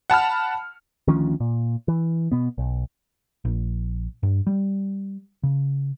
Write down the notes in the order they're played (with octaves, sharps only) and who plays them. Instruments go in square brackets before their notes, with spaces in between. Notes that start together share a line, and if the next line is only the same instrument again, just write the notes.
[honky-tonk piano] F#5 A5 B5 F6
[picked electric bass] D2 D#3 F3 C#4
A#2
E3
B2 B3
B1
A#1
G2
G3
C#3